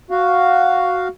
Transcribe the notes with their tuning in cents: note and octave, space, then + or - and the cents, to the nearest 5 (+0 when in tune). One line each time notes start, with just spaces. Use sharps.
F#4 +0 F5 +0